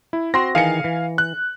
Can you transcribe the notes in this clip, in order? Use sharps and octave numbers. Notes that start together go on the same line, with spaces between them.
E4
C4 F#4 C6 A#6
D#3 E3 G#4 F5 G#5 C#7
E3
F#6